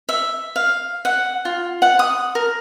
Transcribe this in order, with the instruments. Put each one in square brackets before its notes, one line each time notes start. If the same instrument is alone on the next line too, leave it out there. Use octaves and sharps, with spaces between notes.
[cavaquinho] E5
F5
F#5
F4
F#5
D#6
A#4